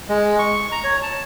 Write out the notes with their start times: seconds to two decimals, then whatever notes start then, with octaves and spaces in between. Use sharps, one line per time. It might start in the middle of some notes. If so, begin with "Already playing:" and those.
0.09 G#3
0.39 C#6
0.72 A#5
0.84 C#5
1.02 A5